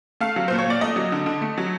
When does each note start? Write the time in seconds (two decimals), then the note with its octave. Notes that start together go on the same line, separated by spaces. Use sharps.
0.20 A3 F5
0.36 F#3
0.48 A#2 C5
0.58 C#5
0.66 A#2 D5
0.81 A3 D#5
0.96 F#3
1.12 D3
1.26 D3
1.41 A3
1.58 F#3